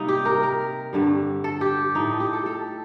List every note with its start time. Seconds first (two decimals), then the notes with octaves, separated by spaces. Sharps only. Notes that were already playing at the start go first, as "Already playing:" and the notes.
Already playing: C3 G3 A#3 C4 D#4
0.08 G4
0.25 A#4
0.43 A#4
0.93 G2 D3 G3
1.44 A4
1.61 G4
1.95 A2 F3 D#4
2.20 G4
2.33 A4
2.46 A4